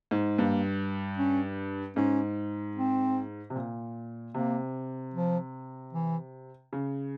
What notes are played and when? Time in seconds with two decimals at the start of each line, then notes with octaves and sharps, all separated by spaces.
0.11 G#2
0.38 G2 A#3
1.17 C#4
1.96 G#2 C#4
2.75 C4
3.50 C3
3.55 A#2
4.34 C3 A#3
5.14 F3
5.93 E3
6.73 C#3